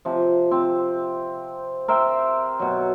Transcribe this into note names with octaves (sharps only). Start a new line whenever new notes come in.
C3 F3
C4
A#4 C5 E5 G5
B2 F#3